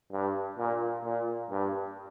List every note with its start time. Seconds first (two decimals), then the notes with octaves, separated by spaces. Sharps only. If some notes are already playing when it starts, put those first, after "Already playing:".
0.13 G2
0.58 A#2
1.05 A#2
1.51 G2